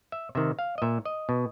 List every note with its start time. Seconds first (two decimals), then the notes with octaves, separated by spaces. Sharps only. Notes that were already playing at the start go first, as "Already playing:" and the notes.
0.12 E5
0.35 C3 D#3 E5
0.59 F5
0.78 D#5
0.82 A#2 E5
1.05 D#5
1.29 B2